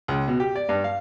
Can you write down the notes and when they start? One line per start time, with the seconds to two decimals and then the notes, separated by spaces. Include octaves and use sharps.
0.08 C#2
0.28 B2
0.40 G4
0.55 D5
0.69 G2
0.84 F5